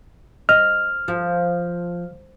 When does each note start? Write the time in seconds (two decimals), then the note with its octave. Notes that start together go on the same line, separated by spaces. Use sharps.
0.49 D#5 F6
1.08 F3